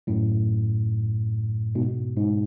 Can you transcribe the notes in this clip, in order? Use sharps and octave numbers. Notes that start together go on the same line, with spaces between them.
F#2 A2
G#2 B2
G#2